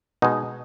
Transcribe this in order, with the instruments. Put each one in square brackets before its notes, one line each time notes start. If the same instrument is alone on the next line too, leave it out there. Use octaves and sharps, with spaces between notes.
[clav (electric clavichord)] B2 G#3 D#4